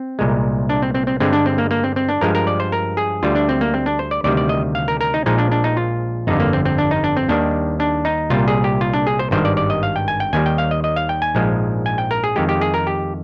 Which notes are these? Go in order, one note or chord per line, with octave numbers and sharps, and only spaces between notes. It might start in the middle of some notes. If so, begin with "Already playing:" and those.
Already playing: C4
C2 A#2 G#3
D4
C4
C4
C4
G2 D3 G#3 C4
D4
C4
A#3
A#3
C4
C4
D4
G2 F3 G#3 A#4
A#4
D5
C5
A#4
G#4
D2 D3 G3 F4
D4
C4
A#3
C4
D4
C5
D5
D2 C3 D#3 G3 D5
D5
D#5
F5
A#4
A#4
D#4
A#1 A#2 F3 G#3 D#4
D4
D4
D#4
F4
G1 F2 D3 D#4
A#3
C4
C4
D4
D#4
D4
C4
D#2 D#3 G3 D4
D4
D#4
C2 A#2 G3 F4
G#4
G4
F4
D4
G#4
C5
G#1 G2 D#3 G3 C5
D5
D5
D#5
F5
G5
G#5
G5
D#2 D#3 G3 G#5
G5
F5
D#5
D#5
F5
G5
G#5
A#1 G#2 F3 G#3
G#5
G5
A#4
G#4
F2 D#3 G#3 G4
G4
G#4
A#4
G4